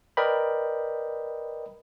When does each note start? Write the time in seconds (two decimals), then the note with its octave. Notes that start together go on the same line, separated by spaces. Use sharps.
0.17 A#4 B4 D5 D#5 G5 B5